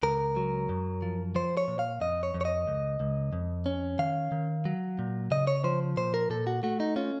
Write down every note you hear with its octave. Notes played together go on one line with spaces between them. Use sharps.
C#2 A#4
F#3
F#2
F3
F3 C5
C#5
A#2
F5
F2 D#5
C#5
F2
C#5
D#5
C#2
C#2
F2
C#4
D#3 F5
D#3
F#3
A#2
C#3 D#5
C#5
F3 C5
A#2 C5
A#4
A#2 A4
F#4
A3 F#4
D#4
C#4 F4